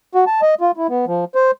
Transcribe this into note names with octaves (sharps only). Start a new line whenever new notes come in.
F#4
A5
D#5
F4
E4
B3
F3
C5